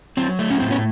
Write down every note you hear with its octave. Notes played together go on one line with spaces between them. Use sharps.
F#3 C4
A3
C#4
A2 C4
B3 C#4